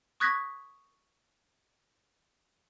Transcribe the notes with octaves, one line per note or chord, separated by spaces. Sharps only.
C#6 D#6 F#6 G#6 A#6 B6